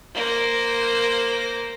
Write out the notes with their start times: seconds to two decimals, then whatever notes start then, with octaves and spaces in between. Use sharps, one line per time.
0.14 A#3 C5